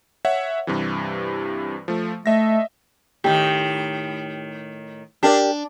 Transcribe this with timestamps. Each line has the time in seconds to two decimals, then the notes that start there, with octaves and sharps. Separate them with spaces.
0.25 C#5 E5 F#5
0.67 G2 C3 E3
1.88 F3 A3
2.26 A3 D#5 E5 A#6
3.24 A2 D#3 G4
5.23 D4 G4 A#4 D5